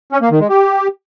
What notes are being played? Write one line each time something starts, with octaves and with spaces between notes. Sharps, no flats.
C#4
A#3
D#3
G#3
G4